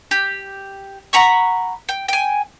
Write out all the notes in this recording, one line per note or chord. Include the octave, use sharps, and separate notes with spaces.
G4
F#5 A#5 B5 C#6
G5
G5 G#5